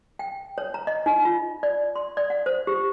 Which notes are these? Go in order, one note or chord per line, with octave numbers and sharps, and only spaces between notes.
G5
C#5
A#5
D#5
D#4
F4
D5
C6
D5
F#5
C5
G4